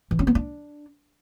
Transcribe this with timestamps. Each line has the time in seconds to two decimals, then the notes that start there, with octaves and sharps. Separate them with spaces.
0.11 E3
0.19 C#4
0.27 B3
0.35 D4